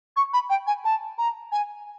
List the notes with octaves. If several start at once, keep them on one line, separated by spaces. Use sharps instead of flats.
C#6
B5
G5
G#5
A5
A#5
G#5